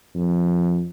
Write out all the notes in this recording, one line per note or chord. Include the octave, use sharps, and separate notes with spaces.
F2